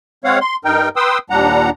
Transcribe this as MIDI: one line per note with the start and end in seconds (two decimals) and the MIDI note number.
0.24 0.39 56
0.24 0.39 60
0.24 0.39 73
0.24 0.39 77
0.24 0.39 78
0.41 0.56 84
0.65 0.89 43
0.65 0.89 63
0.65 0.89 70
0.65 0.89 79
0.96 1.18 71
0.96 1.18 79
0.96 1.18 84
0.96 1.18 87
0.96 1.18 88
1.30 1.70 39
1.30 1.70 46
1.30 1.70 55
1.30 1.70 62
1.30 1.70 78
1.30 1.70 82